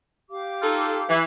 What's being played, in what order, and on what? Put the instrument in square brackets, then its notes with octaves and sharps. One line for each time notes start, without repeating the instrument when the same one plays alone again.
[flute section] G4 F5 D6
[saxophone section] D#4 F4 A4
E3